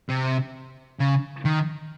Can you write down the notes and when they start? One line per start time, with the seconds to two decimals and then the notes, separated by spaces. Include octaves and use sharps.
0.09 C3
0.99 C#3
1.45 D#3